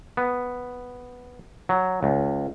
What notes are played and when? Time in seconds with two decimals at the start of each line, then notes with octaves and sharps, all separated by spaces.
0.17 B3
1.69 F#3
2.03 C#2